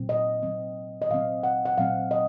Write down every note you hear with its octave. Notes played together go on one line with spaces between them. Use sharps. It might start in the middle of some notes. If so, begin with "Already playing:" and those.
Already playing: A#2 F#3 C4
D#5
A#2 F#3 C4
D#5
A#2 F#3 C4 F5
F#5
F#5
A#2 F#3 C4 F5
D#5